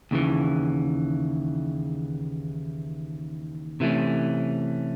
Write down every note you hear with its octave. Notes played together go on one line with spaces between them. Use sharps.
D#2 C#3 E3
C3 E3 A3 C#4